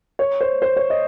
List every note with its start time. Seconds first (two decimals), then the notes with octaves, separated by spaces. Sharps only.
0.19 C#5
0.41 C5
0.62 C5
0.77 C#5
0.90 D#5